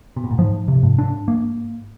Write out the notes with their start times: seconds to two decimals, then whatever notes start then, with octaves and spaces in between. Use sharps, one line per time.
0.16 B2
0.24 A#2
0.31 A2
0.38 G#2 F3
0.68 C3
0.83 G#2
0.98 D4
1.28 A#3